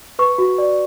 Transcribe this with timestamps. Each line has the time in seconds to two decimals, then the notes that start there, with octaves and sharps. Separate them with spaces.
0.19 B4 C#6
0.38 F#4
0.58 D5